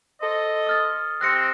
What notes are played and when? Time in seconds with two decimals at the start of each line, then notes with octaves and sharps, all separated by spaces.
0.22 A4 C5 D#5
0.67 D#6 F6 A6
1.21 C3 C4 F#6 A#6 C#7